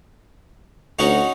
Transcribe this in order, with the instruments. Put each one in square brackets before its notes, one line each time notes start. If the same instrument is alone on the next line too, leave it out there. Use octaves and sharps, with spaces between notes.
[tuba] D2 [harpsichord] C#4 D#4 F#4